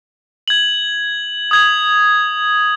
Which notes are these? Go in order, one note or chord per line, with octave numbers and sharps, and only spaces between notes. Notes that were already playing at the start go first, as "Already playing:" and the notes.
G#6 F#7
D#6 G#6 F#7